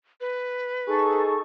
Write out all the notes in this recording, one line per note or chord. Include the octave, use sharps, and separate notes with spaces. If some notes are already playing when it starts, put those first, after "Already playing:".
B4
D#4 G#4 A4 C#6